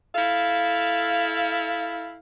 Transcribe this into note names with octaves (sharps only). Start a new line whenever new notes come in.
E4 A4 F5